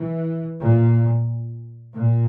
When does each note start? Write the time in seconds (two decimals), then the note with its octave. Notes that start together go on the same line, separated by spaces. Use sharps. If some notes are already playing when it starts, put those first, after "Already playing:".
Already playing: E3
0.59 A#2
1.92 A#2